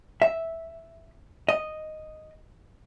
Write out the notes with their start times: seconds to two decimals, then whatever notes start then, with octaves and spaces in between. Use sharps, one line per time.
0.22 E5
1.49 D#5